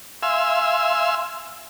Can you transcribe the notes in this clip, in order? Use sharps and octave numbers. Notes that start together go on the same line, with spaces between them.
E5 F5 G#5 C6 E6